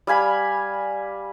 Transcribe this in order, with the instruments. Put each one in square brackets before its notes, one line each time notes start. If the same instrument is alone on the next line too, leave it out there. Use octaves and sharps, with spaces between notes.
[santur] G3 F5 G#5 B5